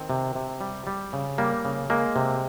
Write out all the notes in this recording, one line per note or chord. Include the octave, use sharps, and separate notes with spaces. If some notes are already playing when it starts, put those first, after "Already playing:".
Already playing: D#3 C4
C3
C3
G3
G3
C#3
G3 A#3
C#3
G#3 A#3
C3